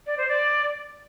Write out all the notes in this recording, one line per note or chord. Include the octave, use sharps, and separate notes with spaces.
D5
C5
D5